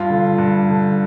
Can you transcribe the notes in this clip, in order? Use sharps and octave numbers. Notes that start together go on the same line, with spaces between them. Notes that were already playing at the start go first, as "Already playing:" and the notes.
Already playing: G2 F4
D3
G2
D3